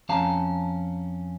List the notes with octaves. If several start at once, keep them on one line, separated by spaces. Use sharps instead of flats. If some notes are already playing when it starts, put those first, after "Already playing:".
F2 C#4 F5 A5 A#5